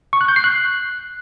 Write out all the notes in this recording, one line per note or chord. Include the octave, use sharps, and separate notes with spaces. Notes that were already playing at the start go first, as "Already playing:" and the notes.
C#6
F#6
G6
C7
F#6